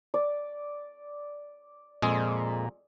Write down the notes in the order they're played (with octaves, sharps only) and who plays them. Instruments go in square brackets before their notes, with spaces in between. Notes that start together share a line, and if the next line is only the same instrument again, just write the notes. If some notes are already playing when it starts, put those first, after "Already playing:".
[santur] D5
[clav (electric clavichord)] F2 G#3 G#4 [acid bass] A#2